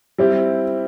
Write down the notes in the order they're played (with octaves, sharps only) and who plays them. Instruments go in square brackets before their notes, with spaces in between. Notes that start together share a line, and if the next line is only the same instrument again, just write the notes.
[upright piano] G3 C4 E4 G4